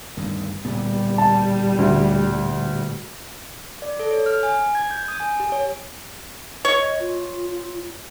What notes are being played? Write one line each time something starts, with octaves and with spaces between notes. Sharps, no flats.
D2 G2 D#3
D1 A#2 G3 B3
A5
D2
D5
A4
C#5
F6
G#5
G#6
G6
D#6
G#5
G4
C#5
C#5 D#5
F4